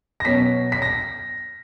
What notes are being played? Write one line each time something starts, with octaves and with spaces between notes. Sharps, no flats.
A#6
B2 F#3 C#4 B6
B6
A#6